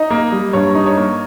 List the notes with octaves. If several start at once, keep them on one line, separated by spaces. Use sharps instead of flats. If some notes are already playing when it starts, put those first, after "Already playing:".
Already playing: D#4 D#5
A#3
G3
G2 C#5
D#4
C#5
A#3